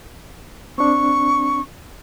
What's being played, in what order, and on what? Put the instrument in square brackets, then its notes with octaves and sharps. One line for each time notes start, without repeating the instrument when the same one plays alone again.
[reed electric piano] C4 D4 [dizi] C#6